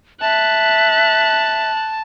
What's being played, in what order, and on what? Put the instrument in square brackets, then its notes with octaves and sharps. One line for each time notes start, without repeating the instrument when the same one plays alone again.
[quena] E5 [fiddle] A5 [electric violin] F#6